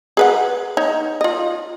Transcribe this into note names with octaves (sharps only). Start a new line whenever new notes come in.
G#4 B4 F#5
D#4 C#5
F4 D#5